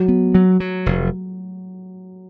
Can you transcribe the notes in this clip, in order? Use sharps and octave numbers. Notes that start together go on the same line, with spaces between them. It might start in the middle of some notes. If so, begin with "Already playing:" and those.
Already playing: F#3
B3
F#3
F#3
F1